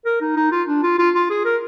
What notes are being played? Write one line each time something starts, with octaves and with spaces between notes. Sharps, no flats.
A#4
D#4
D#4
F4
D4
F4
F4
F4
G#4
A#4